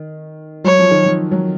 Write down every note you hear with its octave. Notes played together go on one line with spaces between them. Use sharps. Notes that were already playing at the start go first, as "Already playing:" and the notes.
Already playing: D#3
F#3 C#5
F3
D#3
F3
F#3